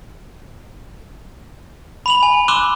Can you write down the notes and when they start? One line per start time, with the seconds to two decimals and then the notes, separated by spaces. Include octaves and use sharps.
2.06 B5 F7 F#7
2.23 G#5
2.48 C6 D6 E6 F#6 E7 G7